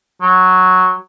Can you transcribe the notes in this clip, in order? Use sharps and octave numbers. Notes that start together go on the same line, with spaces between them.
F#3